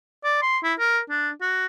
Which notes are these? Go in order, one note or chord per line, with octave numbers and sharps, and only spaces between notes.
D5
C6
E4
A#4
D4
F#4